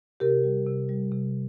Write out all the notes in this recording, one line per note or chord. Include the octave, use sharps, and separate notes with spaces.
C3 G4 A#4
G3
C3
G3
C3